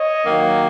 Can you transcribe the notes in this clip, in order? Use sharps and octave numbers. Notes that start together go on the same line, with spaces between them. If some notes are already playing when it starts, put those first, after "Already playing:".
Already playing: C#5 D#5
D#3 F#3 A#3